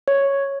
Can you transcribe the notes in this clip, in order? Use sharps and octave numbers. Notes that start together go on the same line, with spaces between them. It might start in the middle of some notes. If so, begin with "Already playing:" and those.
C#5